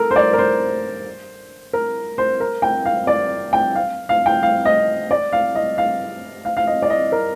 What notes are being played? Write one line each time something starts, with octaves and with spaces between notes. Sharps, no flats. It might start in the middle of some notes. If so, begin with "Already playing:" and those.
Already playing: A4 A#4
C5
D5
A#4
C5
A#4
C5
A#4
G5
F5
D5
G5
F5
F5
G5
F5
D#5
D5
F5
D#5
F5
F5
F5
D#5
D5
D#5
A#4